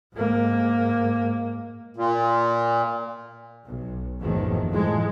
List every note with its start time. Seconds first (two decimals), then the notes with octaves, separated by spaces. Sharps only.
0.14 G#2 A#3
1.96 A#2
3.66 B1
4.20 F#1 E2 A2 D#3 F3
4.70 A2 E3 F3 G#3